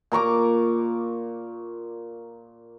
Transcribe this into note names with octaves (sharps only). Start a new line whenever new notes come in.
A#2 A#5 C#6 D6